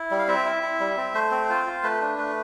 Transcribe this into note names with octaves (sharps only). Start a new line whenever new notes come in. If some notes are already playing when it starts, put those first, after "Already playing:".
Already playing: E4
G3
F5
C4 E5
E4
E4
G3
C4
A3 C5
C4
F4
F4
A3 B4
D4
A3